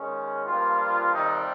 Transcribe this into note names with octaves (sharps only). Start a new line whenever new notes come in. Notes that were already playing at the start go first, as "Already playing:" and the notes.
Already playing: D#2 D#3 G#3 C#4
G2 F3 G3 A#3 F4
F2 C3 D#3 G3 D#4